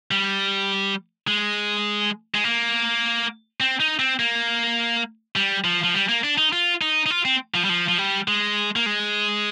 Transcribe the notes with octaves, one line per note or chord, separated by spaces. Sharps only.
G3
G#3
G#3
A#3
C4
D#4
C4
A#3
G3
F3
F3
G3
A#3
D4
D#4
F4
D#4
D#4
F4
C4
F3
G3
F3
F3
G3
G#3
A#3
G#3